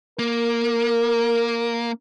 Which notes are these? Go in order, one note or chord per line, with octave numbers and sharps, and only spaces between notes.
A#3 A#4